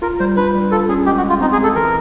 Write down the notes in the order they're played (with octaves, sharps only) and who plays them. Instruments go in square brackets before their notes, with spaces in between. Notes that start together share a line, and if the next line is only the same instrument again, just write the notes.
[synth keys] F4 [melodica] A#4
[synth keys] G3 [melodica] C5
[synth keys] D4 [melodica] B4
[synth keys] G3
[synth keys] F4 [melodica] A4
[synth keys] C#4 [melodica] G#4
[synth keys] G#3 [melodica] G4
[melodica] F#4
[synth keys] G#3
[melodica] F4
[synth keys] C4 [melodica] D#4
[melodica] G#4
[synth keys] G#3
[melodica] A4
[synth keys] E3 [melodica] A#4